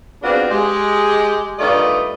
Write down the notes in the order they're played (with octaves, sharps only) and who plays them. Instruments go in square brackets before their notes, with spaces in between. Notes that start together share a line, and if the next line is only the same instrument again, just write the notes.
[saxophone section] B3 C4 D4 F4 F#4 G#4
G#3 G4
G2 D#3 A3 F4 D5 D#5